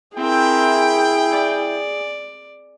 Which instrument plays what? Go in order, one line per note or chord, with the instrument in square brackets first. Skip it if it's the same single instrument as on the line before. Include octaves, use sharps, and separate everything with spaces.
[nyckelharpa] C4 A#4 [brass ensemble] E4 G5 [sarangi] G#4
[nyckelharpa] D5